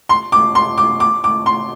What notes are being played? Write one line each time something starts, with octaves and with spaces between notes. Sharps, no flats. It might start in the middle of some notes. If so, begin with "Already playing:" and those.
C6
D6
C6
D6
D6
D6
C6